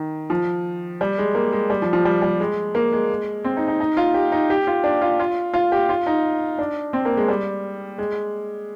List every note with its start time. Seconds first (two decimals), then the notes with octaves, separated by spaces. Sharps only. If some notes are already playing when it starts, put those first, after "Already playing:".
Already playing: D#3
0.30 F3
1.01 G3
1.18 G#3
1.35 A#3
1.53 G#3
1.70 G3
1.82 F3
1.93 F3
2.05 G3
2.22 G3
2.40 G#3
2.75 A#3
2.93 G#3
3.44 C4
3.57 D#4
3.68 D#4
3.80 D#4
3.97 F4
4.14 G4
4.32 D#4
4.50 G4
4.67 F4
4.84 D4
5.02 F4
5.20 F4
5.54 F4
5.72 G4
5.89 F4
6.06 D#4
6.58 D4
6.93 C4
7.05 A#3
7.17 G#3
7.28 G3
7.98 G#3